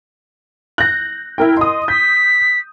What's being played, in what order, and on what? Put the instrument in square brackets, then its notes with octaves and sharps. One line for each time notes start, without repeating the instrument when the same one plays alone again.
[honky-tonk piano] F#6 G6 A#6
E4 A#4 G5
[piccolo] D#5 [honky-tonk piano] C6 D#6
[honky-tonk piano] G6 [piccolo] B6